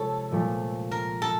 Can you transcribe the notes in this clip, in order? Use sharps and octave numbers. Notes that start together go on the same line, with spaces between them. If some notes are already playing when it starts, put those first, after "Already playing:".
Already playing: C3 F3 G#3 A4 C#5
A#2 F3 A3
A#4
A4